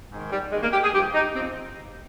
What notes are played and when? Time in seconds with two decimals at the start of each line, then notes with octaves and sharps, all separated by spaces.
0.12 G#2 D#3
0.31 G3
0.52 D#2 D#3 G#3
0.63 A#3
0.73 G4
0.83 G#4
0.93 G2 F3 G4
1.14 D#4
1.34 F3 C4